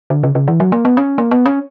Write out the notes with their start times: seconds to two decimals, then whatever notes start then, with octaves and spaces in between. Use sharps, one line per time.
0.10 D3
0.23 C#3
0.35 C#3
0.48 E3
0.60 F#3
0.72 A#3
0.85 B3
0.97 C#4
1.18 A#3
1.31 B3
1.46 C#4